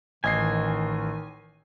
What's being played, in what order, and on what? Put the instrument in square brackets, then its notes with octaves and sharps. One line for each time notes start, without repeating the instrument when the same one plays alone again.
[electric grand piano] A1 D#5 C7 [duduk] D#3 [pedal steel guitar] G#5